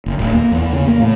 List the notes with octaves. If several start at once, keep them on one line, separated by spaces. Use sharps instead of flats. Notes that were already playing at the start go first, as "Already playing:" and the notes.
F#1
D1
A#3
E2
C#3
A#3
A2